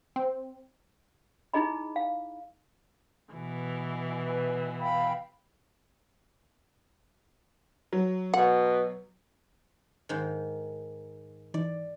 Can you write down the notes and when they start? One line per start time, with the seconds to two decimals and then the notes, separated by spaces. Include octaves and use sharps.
0.16 C4
1.54 D#4 E4 G#4 D#5 B5
1.96 F5
3.33 B2 E3
4.20 B4
4.78 F5 G5 B5
7.93 F#3
8.34 B2 F#5
10.09 G#2 D#3
11.54 E3 D#4 D5